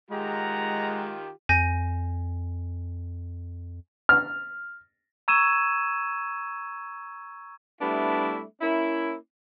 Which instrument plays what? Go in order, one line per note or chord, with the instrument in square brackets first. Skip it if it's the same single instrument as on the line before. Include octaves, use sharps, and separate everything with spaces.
[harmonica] D#3 F4 G4 [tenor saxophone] G#3 [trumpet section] F#5 A#5
[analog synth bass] F2 [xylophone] G#5 G6 A#6
[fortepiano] F6
[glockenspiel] A#5 C#6 E6 G#6 D#7 E7
[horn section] G3 A3 B3 D4 E4
A#3 C#4 E4